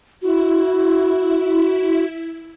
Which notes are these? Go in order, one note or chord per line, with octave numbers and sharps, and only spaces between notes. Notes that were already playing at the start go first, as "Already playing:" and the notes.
E4 F#4